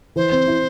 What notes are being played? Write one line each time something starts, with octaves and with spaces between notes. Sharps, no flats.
E3 C5
C4
E4